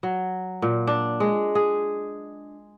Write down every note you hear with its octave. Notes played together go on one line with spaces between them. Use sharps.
F#3
A#2
D4
G#3
G#4